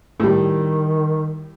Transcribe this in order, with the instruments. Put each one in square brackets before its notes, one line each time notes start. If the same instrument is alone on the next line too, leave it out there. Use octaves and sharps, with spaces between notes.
[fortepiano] A2 G3 [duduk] D#3